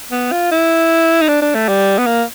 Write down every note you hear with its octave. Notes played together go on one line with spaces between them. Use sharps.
B3
F4
E4
D#4
D4
D4
A3
G3
B3
A#3